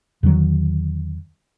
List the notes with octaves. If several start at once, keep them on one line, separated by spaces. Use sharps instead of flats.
E2 D3 D#3 F#3